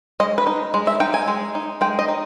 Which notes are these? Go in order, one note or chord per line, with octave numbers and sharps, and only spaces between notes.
G#3 D#5
B4
D#4
G#3
E5
D#4 G5
G#5
G#3
D#4
G#3 G5
D#5
D#4